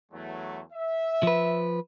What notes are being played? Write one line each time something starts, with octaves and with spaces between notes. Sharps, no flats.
E2 F#3 A3
E5
F3 B4